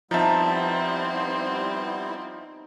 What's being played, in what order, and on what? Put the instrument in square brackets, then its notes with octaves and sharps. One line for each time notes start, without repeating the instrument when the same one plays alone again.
[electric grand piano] F3 E5 [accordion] G3 B3 E4 [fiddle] C4 [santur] D#4 A5